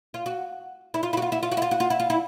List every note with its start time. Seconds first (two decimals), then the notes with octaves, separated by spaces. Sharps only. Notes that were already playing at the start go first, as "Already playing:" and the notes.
0.14 F4
0.26 F#4
0.94 E4
1.03 F4
1.13 E4
1.17 F#4
1.22 F4
1.32 E4
1.43 F4
1.52 F#4
1.57 E4
1.62 F4
1.71 F#4
1.80 F4
1.90 E4
2.00 F4
2.10 E4